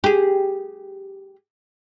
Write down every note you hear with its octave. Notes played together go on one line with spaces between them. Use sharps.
G4 G#4